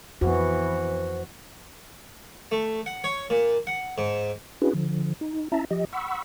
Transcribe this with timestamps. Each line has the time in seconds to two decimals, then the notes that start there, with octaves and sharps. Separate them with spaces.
0.21 F2 E3 B3 F#4 C5
2.51 A3
2.86 F#5
3.04 C#5
3.30 A#2
3.67 F#5
3.98 G#2
4.62 C#4 D4 E4 F#4 G#4 B4
4.74 D3 F3
5.21 D#4
5.52 C#4 E4 E5 A5 A#5
5.71 F3 G4 D#5
5.93 F#5 B5 C#6 E6